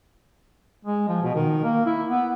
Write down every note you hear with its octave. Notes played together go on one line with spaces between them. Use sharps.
G#3
F3
B2
D#3
A#3
E4
B3